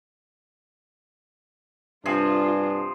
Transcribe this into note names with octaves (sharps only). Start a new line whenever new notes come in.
G2 C3 F3 D4 F4 G#4